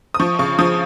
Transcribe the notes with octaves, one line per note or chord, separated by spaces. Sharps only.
D#6
F3 C#6
C#3 C#6
F3 D#6